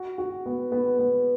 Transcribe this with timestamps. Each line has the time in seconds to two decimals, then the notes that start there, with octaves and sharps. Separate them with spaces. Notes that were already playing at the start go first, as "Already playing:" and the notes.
Already playing: F#4
0.18 F#4
0.46 B3
0.72 B3
0.99 B3